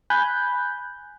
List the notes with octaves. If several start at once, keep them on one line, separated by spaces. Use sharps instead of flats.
G#5 B5 F#6 G6